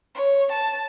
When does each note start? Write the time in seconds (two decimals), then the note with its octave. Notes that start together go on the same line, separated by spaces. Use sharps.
0.15 C#5
0.51 A5